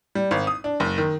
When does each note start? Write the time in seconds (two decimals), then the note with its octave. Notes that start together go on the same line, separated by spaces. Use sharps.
0.15 G3
0.31 G#1
0.47 D#6
0.64 D4
0.80 F#1
0.98 D#3